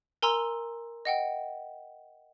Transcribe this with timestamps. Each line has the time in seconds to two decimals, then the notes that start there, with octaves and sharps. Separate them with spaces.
0.22 A#4 G#5 A#5 C6 E6
1.05 D#5 F#5 G5